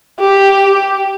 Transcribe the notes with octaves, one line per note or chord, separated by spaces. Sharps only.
G4